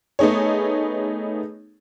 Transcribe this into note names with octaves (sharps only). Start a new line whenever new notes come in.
A3 B3 D#4 G#4 C#5